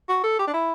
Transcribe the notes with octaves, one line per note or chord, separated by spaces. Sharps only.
F#4
A4
G4
D4
E4